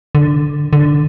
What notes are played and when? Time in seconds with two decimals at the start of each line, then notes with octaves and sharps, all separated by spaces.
0.15 D3
0.73 D3